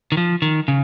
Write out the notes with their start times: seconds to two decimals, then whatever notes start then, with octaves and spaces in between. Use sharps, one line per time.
0.12 D#3
0.17 F3
0.42 D#3
0.68 C#3